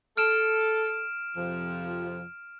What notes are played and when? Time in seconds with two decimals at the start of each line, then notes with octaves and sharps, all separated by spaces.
0.17 A4 F6 D7 E7
1.35 F2 C3 F3